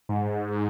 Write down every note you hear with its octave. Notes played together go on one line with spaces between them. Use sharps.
G#2